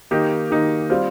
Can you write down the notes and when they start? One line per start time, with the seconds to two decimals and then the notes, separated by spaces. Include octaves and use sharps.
0.11 D#3 A#3 D#4 G4
0.50 D#3 A#3 D#4 G4
0.90 G3 C4 F4